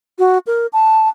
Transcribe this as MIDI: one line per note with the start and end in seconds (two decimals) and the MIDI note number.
0.19 0.38 66
0.47 0.66 70
0.73 1.08 81